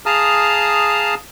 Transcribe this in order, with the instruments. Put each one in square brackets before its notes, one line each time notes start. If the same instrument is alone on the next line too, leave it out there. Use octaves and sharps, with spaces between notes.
[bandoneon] G#4 F5 A5 A#5 D#6 F6